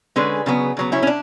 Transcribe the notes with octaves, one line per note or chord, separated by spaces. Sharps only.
D3 G#3 C#4 G#4 B4
C#3 F#3 B3
C#3 F#3 B3
C#4 E4
C#4
D4